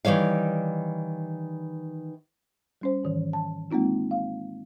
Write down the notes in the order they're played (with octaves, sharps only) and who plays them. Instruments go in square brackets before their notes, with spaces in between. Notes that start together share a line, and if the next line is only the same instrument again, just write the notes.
[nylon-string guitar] D#3 E3 G3 C#5 F5
[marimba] G3 C#4 C5
G#2 D#3 E3
A5
G#3 A#3 C4 D#4 F4
F5